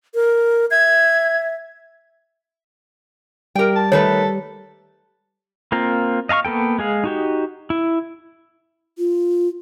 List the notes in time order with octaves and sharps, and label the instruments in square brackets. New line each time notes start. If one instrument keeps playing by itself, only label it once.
[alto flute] A#4
[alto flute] E5 [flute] G#6
[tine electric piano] G3 G4 [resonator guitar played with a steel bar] A#4 G5
[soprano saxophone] A5
[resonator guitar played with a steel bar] D#3 A3 B4 [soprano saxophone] A4 [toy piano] C#5
[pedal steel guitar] A#3 C4 F4 A#4
D#5 F5 A5 C#6 F6
A#3 B3 A4 G5
G#3 G#4 F5
D#4 F#4 G4
E4
[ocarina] F4